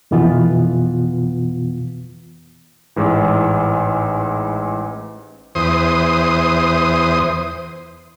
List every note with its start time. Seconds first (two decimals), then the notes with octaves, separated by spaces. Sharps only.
0.11 F2 B2 E3 B3 F4
2.96 A1 G#2 E3
5.55 E2 C5 D#6